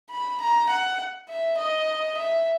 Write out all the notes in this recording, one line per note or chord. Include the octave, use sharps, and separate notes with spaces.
B5
A#5
F#5
E5
D#5
E5